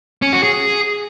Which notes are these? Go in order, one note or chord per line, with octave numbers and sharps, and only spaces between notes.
C#4
F#4
G#4